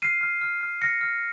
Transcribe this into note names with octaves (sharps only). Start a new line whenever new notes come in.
F6 C7 D#7
F6
F6
F6
F6 A#6 C#7
F6